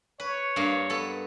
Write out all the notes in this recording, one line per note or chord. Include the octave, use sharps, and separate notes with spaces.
B4 C#5
G2 A#3
B3 A4